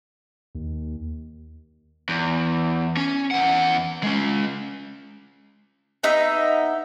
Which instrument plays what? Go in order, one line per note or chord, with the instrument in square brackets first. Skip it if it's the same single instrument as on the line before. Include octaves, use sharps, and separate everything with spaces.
[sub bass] D#2
[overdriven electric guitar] E2
C#4
E2 F#5
G#3 C#4
[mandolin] B3 D#4 E5